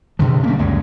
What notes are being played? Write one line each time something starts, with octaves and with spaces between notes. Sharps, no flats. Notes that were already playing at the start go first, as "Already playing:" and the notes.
D2 B2 D3 F3
G3 A#3 C#4
C#2 F#2 G#3